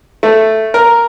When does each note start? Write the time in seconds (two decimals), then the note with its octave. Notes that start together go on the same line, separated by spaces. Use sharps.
0.23 A3
0.74 A#4